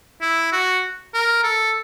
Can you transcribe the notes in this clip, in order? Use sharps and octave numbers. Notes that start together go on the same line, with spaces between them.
E4
F#4
A#4
A4